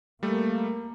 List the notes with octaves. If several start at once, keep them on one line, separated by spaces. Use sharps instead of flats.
G3 A3 A#3